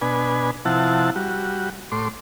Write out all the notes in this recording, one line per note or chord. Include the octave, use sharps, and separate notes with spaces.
B2 D4 B4 G#5
C3 F3 E4 F#5 A5
G3 F#4
A2 C6 D6